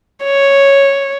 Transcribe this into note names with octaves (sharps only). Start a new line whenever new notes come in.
C#5